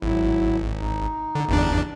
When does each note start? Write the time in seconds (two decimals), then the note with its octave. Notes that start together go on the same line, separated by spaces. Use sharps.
0.02 G#1 F#3 E4
0.78 D#4
1.35 D3
1.49 G1 E2 D4